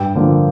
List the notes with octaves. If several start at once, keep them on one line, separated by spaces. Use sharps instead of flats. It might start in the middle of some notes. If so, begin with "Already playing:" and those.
Already playing: G2 G5
D3 F3 A#3